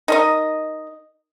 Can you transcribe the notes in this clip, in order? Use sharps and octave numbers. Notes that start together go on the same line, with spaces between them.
D#4 A#4 D#5